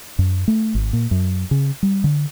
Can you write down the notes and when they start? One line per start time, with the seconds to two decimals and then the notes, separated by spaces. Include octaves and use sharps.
0.19 F#2
0.48 A3
0.75 G#1
0.93 A#2
1.11 F#2
1.51 C#3
1.83 G3
2.04 D3